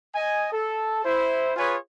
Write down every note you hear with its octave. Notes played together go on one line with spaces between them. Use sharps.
D#5 G#5
A4
E4 C5
F4 G#4 B4 C#5 G#5